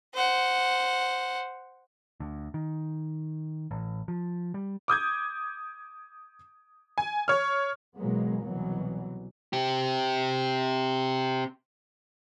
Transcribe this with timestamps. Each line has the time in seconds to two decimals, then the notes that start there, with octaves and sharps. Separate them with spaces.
0.14 C5 F#5
2.20 D2
2.54 D#3
3.71 A1
4.08 F3
4.54 G3
4.88 D6 D#6 G6 G#6
6.98 G#5
7.28 C#5 F6
7.97 B2 E3 F#3 G#3 A#3 B3
8.44 C2 B2 E3 F#3
9.53 C4 G4